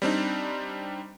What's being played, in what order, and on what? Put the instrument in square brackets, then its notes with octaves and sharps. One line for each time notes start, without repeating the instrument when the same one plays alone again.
[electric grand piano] G3 C4 D4 D#4